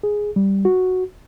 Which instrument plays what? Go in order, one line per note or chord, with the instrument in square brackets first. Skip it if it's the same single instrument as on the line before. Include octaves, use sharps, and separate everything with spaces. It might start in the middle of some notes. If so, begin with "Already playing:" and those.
[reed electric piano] G#4
G3
F#4